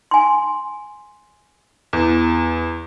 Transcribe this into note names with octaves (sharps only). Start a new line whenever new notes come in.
G#5 C6
E2